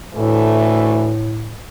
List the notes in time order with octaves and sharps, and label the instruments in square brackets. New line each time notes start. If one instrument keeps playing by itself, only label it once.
[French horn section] D2 E3 A3 [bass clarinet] A2